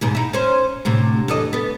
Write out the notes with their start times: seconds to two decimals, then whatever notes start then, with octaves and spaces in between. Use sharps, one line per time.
0.01 D#2 G#2 B2
0.15 D#4 E4
0.33 C#4 C5
0.85 D2 A2 C3
1.28 E2 A4 D#5
1.53 B3 A4